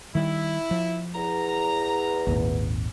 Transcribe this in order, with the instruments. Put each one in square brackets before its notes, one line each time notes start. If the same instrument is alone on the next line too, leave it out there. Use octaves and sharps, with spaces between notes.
[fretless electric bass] D#3 G3 [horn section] E4
[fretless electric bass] F3
[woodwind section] E2 [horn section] A#5
[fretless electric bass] G#1 D#2 A#2